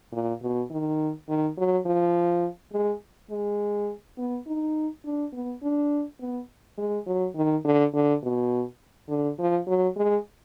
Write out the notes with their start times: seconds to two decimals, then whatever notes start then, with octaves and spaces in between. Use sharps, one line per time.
0.12 A#2
0.42 B2
0.71 D#3
1.28 D#3
1.58 F#3
1.86 F3
2.73 G#3
3.31 G#3
4.18 B3
4.47 D#4
5.05 D4
5.33 B3
5.63 D4
6.20 B3
6.78 G#3
7.07 F#3
7.36 D#3
7.65 D3
7.94 D3
8.23 B2
9.09 D3
9.38 F3
9.67 F#3
9.96 G#3